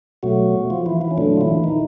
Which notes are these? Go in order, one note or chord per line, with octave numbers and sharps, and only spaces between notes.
B2 F#3 A3 F#4
F3 F4
E3 E4
E3 E4
C#4
A#2 D3 F#3 A3 D4
F4
E3 E4
D#3 D#4